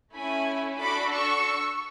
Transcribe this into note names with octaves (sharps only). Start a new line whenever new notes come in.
A3 C#4 E4 G#5 B5
D4 F#4 A4 B5 D6
C#6 E6